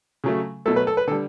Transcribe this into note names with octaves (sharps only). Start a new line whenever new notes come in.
C#3 F#3 A3
B2 F#3 A3 A4
B4
A4
B4
D3 G3 A4